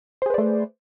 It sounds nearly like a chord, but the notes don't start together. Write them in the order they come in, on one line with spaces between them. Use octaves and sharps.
C5 G#4 B4 D5 A3